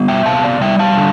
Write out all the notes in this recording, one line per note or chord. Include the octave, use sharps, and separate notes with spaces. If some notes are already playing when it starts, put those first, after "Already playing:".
Already playing: G3 B3
E5 G5
C3 F5 A5
D5 F5
G3 E5 G5
F5 A5
D3